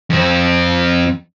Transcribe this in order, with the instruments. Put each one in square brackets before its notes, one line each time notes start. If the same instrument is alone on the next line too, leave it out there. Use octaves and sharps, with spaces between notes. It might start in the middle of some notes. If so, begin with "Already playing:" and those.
[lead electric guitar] F2 C4